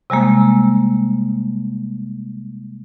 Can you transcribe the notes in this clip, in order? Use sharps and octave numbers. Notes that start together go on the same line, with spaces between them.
C3 G3 G#3 A#3